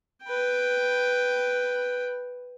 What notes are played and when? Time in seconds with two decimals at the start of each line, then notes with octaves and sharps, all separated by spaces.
0.24 B4 G5